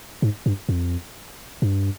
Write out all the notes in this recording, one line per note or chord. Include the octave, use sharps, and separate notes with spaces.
G#2
G2
F2
G2